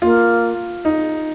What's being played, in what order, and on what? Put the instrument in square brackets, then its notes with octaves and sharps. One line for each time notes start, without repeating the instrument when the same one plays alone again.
[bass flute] A#3 [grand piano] F4
[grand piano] D#4